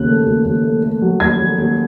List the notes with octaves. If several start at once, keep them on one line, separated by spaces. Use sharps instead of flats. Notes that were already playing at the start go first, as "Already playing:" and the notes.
Already playing: D#2 C#3 F#6
A3
D#2
D#2
A3
A3
F#3
D#2 G#6
D#2
D#2